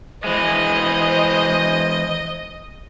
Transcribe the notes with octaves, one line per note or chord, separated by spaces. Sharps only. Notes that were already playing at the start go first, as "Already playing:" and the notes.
E3 G#3 C5 D#5